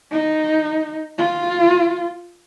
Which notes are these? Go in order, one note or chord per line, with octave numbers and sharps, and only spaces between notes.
D#4
F4